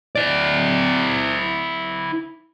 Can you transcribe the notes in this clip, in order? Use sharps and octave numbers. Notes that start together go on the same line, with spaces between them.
E4 D5